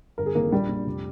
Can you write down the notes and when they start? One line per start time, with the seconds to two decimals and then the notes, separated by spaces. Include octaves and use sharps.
0.18 G1 A#4
0.26 G#4
0.35 F2 D#3 A#3 A#4
0.52 A#1 G3 G4
0.69 A#2
0.86 F1